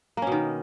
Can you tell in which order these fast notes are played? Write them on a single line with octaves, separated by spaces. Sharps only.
A#3 C#4 B2 D#3